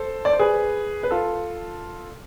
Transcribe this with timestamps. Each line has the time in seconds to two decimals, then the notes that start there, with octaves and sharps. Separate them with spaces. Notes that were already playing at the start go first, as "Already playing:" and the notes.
Already playing: A4 C5
0.25 D5
0.33 C5
0.39 G#4 B4
1.03 B4
1.11 F4 A4